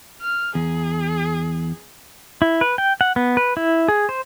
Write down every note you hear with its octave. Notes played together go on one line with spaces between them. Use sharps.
F6
E2 G#4
E4
B4
G5
F#5
B3
B4
E4
G#4
C5